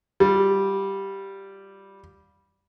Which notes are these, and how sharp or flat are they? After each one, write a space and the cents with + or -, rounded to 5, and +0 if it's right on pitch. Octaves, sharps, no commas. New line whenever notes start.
G3 +0 F4 +30